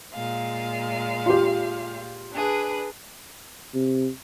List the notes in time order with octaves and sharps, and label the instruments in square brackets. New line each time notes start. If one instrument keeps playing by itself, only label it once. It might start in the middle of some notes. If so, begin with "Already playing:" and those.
[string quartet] A#2 G#3 F5
[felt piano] F4 G4
[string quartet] D4 G#4 B4
[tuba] C3